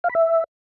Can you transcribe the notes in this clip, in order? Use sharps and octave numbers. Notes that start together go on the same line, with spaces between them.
F5
B5
E5